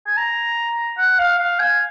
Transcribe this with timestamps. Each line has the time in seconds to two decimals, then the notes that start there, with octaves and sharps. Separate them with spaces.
0.07 G#5
0.17 A#5
0.98 F#5
1.19 F5
1.39 F5
1.60 G#5